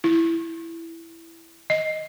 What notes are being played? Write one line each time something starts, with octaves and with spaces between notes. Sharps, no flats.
E4
D#5